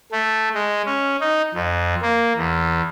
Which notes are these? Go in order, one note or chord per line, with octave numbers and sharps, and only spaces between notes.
A3
G#3
C#4
D#4
F2
A#3
E2